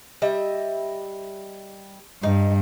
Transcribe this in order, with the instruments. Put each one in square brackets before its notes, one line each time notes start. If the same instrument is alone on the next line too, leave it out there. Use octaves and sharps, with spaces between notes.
[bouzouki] G3 D#5 E5
[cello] G2 [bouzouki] D#4